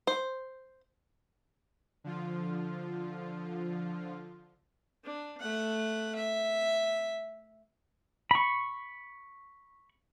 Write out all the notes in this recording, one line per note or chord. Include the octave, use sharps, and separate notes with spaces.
C5
D3 F3 F4
D4
A3 F#5
E5
B5 C#6